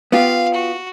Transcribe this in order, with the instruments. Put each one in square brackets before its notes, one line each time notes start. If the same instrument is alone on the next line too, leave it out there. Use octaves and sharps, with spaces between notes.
[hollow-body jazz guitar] B3 F4 G4 [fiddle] F5
[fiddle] F#4